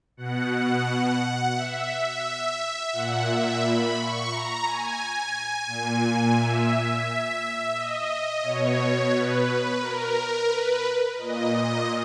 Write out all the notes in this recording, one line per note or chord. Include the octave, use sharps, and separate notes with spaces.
B2 F#5
F#5
E5
A#2 F#5
E5
B5
C#6
A#5
G#5
A#2
E5
D#5
B2 C#5
B4
A#4
B4
A#2 D#5
D#5